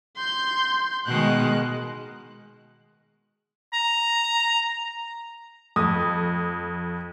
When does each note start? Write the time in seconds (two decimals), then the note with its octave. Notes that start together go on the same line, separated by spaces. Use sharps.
0.17 C6 G6
1.06 B2 D#3 G#3 F#6
3.73 A#5
5.76 F2 D#6